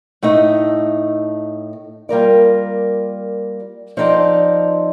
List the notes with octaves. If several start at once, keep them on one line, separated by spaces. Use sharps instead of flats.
A2 A3 D#4
G3 A#3 F4 A#4 D5
F3 C4 D#4 A4 D5